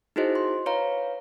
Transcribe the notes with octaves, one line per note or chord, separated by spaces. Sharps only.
D#4 E4 F#4 G#4 C5 D#5
C6
B4 C#5 F5 A#5